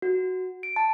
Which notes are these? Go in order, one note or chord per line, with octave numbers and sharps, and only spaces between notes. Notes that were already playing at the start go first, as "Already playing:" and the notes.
F#4
D7
A5